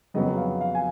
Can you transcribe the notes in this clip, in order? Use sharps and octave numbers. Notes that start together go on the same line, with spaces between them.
F2 C#3 F#3 B3 D#5
F5
F5
G#5